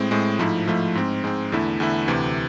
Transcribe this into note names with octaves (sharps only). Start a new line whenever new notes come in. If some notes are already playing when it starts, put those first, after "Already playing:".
Already playing: A2 G#3 C4
A2 G#3 C4
G#2 F3 A3 E4
G#2 F3 A3 E4
G#2 G#3 C4
G#2 G#3 C4
E2 D3 A3 E4
E2 D3 A3 E4
D2 C3 E3